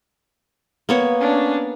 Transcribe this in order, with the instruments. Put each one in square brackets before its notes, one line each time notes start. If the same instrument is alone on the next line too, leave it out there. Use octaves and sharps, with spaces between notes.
[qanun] A#3 B3 C#5
[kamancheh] C#4 D4